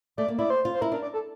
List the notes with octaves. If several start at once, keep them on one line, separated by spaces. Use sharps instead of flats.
A3 D5
A#3
E4 D5
C5
F4
C5
E4 A#4
D4 A#4
D5
A4